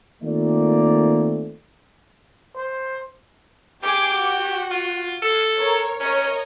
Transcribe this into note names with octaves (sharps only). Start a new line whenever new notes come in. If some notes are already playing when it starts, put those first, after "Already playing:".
D#3 A3 A#3 C4 F4 D5
C5
G4 G#4 D6
F#4
F4
A4
A#4 C#5
C#4 A#4 C#5 D#5